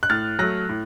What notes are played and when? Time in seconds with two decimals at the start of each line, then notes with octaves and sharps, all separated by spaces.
0.03 F#6
0.10 A2 F6 A6
0.39 F#3 A3 F#6 A#6
0.69 A2